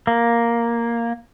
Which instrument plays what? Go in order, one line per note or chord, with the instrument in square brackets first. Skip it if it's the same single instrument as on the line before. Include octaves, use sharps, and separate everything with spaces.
[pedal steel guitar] A#3